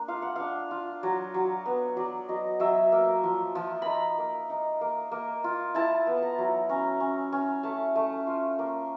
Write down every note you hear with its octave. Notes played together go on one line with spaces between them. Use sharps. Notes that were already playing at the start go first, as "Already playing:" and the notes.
Already playing: A#3 D4
F4 F5
F#5
D4 F5
F4
F#3
F#3
B3
F#3 D5
F#3 D#5
F#3 E5
A#3
F3
F3
D#4 A#5 B5
A#3
D#4
A#3
A#3
F4
E4 A5
B3
A5
A#5
F#3
C#4 A#5
C#4
C#4
A3 A5
A3
F4
A#3